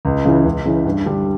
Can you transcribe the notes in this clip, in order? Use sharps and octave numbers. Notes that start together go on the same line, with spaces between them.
C#2
C#3 E3
C#2
C#3 E3
G2
D3 G3